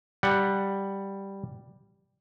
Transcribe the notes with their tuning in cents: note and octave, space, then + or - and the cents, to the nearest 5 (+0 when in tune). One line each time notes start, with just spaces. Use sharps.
G3 +0 F#5 +0